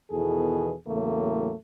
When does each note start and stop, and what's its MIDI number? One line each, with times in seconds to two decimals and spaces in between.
0.11 0.74 40
0.11 0.74 47
0.11 0.74 51
0.11 0.74 52
0.11 0.74 68
0.11 0.74 69
0.86 1.52 40
0.86 1.52 45
0.86 1.52 49
0.86 1.52 54
0.86 1.52 57
0.86 1.52 58